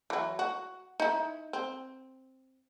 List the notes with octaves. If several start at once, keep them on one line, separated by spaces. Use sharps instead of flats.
E3 F#3
F#4
D#4 E4
C4